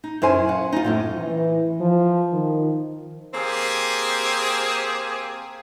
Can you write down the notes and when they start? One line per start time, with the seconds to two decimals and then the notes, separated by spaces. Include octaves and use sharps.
0.04 D#4
0.22 F#2 E4 C5 G#5
0.48 F5 F#5
0.73 D#4 F4
0.84 F#2 A2 D#3
1.18 E3
1.80 F3
2.33 D#3
3.34 A#3 C4 G4 G#4